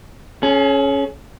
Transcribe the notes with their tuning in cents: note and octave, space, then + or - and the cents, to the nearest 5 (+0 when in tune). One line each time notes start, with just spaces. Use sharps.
C#4 +0 G#4 +45